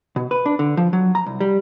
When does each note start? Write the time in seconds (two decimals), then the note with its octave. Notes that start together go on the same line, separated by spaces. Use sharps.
0.16 B2
0.31 B4
0.46 D4
0.59 D3
0.77 F3
0.93 F#3
1.15 A#5
1.26 C2
1.40 G3